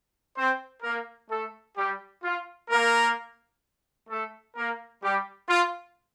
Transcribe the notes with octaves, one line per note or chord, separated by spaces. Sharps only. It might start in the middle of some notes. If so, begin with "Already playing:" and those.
C4 C5
A#3 A#4
A3 A4
G3 G4
F4
A#3 A#4
A3 A4
A#3 A#4
G3 G4
F4